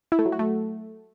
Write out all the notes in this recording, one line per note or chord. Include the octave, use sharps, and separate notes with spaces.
E4
A3
F#3
F#4
A3